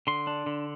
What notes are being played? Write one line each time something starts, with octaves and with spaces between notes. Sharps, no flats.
D3 C6
D4
D3